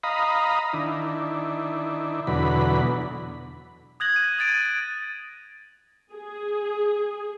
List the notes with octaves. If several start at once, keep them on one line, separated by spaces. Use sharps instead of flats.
D#5 F5 A#5 B5 D#6
D#3 D4 E4
E2 B2 D3 F#3 B5
D#6 F#6 G#6 A#6 F#7
D#7
D#6 G#6 A6 D7 D#7
A6
G#4